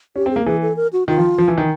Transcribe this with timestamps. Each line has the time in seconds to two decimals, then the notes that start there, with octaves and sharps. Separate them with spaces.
0.16 C#4 G4
0.26 C4
0.31 A#3 G#4
0.46 E3 G#4
0.62 A4
0.76 A#4
0.93 F#4
1.07 D#3 F4
1.18 F3
1.38 F3
1.48 E3
1.58 D#3